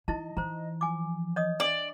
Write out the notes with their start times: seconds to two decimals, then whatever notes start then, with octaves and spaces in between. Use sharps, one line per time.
0.08 E3 D#4 E4 D#5 A5
0.37 E3 C5 A#5
0.81 F3 G#5 D6
1.36 C#5 D#5 D#6
1.60 D4 D5